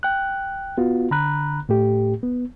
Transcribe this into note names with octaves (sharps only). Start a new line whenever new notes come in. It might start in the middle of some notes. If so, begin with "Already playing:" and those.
G5 F#6
B3 F4 F#4
D3 A#5 B5 F#6
A2 A3 G4
B3